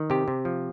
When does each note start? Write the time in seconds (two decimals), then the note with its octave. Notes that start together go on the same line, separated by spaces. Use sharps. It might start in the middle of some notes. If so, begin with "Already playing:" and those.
Already playing: D#3
0.10 C3 G4
0.28 C3
0.45 F3